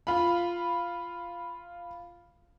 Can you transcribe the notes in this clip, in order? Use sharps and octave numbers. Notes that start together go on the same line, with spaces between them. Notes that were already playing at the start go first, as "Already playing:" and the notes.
F4 B5